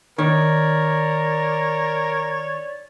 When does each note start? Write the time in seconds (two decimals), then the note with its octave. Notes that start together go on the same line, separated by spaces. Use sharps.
0.18 D#3 A#4 C#5 D5